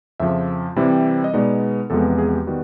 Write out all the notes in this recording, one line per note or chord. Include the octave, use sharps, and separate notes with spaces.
F2 C#3 F3 E5
C3 E3 G3 C4 E4
D#5
B2 G#3 B3 D#4 D5
E2 C3 F3 G#3 B3 A4
G#4
G4
D#3 G3 B3 F#4